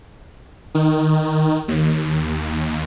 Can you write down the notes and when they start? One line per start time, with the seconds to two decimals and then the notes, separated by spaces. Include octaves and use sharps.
0.75 D#3
1.68 D#2